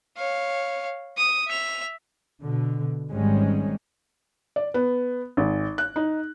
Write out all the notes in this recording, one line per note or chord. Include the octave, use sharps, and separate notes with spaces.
C#5 F5
D#6
E5 F7
B2 D3
G#1 G#2 G3 G#3 C#4
D5
B3
G#1
F#6
D#4